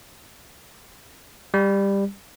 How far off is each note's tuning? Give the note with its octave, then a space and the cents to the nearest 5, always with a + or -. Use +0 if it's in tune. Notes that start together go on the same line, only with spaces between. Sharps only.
G3 +15